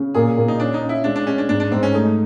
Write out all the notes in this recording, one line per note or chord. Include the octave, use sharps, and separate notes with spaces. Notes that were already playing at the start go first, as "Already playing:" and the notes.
Already playing: C#3
A#2 G#4
A#2
D#4
C#4 D4
D#4
C#4
E4
G#3 D4
D4
G#3 C#4
D4
G#2 D4
D4
G#2 C4
C#4
A3 D#4